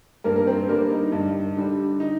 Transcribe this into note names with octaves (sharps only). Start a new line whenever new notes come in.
G2 A#3 A#4
A#4
C4 C5
D3 G3 A#3 A#4
D#4
G2
D3 G3
D#4